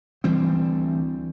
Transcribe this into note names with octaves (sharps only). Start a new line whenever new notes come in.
D2 E3 G3 C4